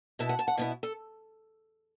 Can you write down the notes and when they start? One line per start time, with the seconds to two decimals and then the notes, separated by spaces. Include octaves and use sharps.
0.19 B2 B3 E4 A5
0.29 F#5
0.39 A5
0.48 F#5
0.57 B2 B3 E4 D5
0.83 A4